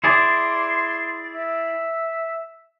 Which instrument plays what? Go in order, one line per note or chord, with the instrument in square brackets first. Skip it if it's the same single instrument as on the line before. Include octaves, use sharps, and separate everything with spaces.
[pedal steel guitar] E4 G#4 D5 [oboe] C6
[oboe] E5